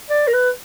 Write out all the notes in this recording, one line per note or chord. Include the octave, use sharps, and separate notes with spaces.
D5
A#4
B4